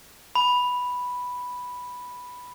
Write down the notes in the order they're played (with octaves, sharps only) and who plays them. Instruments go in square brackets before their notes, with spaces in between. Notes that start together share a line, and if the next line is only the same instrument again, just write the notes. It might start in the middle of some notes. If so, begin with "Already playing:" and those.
[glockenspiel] B5